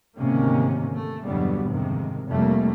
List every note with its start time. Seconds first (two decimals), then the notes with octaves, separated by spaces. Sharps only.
0.17 D2 G#2 C3 D#3 A#3 C#4
0.96 A3
1.25 G1 E2 B2 F#3 G3 B3
1.67 F2 G#2 C3 D#3
2.28 F1 G3 A3 A#3